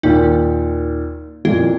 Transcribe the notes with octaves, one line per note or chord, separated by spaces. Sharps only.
D#2 A#2 D#3 D#4
F2 A#2 E4